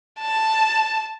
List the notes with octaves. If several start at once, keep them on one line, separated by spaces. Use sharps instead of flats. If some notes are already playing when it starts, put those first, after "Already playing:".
A5